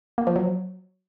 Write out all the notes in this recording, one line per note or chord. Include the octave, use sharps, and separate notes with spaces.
A#3
F3
F#3